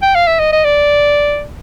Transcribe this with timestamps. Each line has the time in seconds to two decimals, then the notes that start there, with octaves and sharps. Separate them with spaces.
0.02 G5
0.15 F5
0.27 E5
0.39 D#5
0.52 D#5
0.64 D5